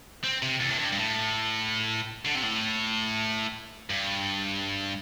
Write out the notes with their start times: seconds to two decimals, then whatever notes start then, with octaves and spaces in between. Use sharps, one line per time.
0.24 C4
0.43 C3
0.60 E2
0.70 A2
0.79 G2
0.92 G2
0.97 A2
2.26 D3
2.35 C3
2.43 A2
3.90 G2